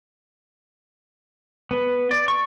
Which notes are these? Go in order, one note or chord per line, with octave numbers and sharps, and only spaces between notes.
B3
D5
C#6